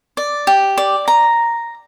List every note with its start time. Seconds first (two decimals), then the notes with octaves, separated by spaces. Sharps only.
0.17 D5
0.47 G4
0.78 D5
1.08 A#5